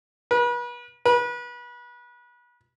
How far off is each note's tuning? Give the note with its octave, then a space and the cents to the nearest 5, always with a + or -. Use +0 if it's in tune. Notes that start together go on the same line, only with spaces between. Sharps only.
B4 -35
B4 -30